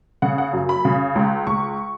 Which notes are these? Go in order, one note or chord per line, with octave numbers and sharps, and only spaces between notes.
C#3 F#5
F#5
F#2
B5
C#3
C#2
C#2 C#6